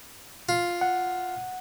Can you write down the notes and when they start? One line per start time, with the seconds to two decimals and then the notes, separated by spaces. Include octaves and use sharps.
0.49 F4
0.81 F#5